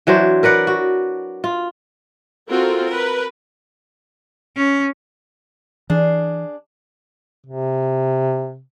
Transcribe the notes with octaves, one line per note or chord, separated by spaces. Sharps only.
E3 F#3 D4 C5
A#4 B4 D5 F#5
F#4
F4
C4 F4 F#4 A4 A#4
A#4 B4
C#4
E3 D4 G#4
C3